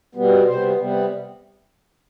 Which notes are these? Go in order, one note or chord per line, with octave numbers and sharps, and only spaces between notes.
B2 G3 B3
C3 G3 B3 C5
C3 G3 B3